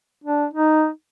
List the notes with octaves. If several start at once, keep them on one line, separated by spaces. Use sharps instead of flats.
D4
D#4